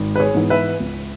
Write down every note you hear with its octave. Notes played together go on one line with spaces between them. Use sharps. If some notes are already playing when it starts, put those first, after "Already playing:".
Already playing: G#1
B4
G#4 C#5
G#2 E3 B3
B4 E5
C#2